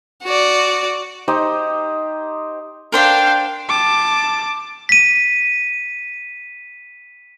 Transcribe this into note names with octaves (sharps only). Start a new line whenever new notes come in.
F#4 D5
D#4 G4 C5 D#5
D4 A#4 C5 F5 G5
A5 D6
B6 D#7